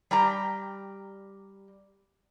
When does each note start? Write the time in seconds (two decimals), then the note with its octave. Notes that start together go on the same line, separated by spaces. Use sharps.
0.11 G3 G4 A#5